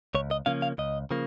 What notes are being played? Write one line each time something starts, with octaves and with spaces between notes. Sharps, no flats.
C#2 C#5
D#5
C#3 F3 A#3 C#4 F5
F5
C#2 D#5
C#3 F3 A#3